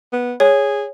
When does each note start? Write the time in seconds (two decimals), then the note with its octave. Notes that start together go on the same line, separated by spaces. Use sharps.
0.12 B3
0.40 G#4 C#5